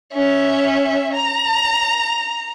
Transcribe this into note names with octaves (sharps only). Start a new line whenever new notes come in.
C#4 E5
A#5